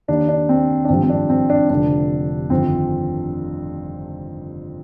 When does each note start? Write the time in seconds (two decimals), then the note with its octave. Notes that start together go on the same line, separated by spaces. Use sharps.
0.08 D#2 D#3 D4
0.29 D4
0.49 C4
0.85 D4
0.89 G#1 G2 F3 C4
1.03 C4
1.10 D4
1.30 C4
1.50 D4
1.69 F1 F2 D3 D4
2.50 G1 F2 D#3 C4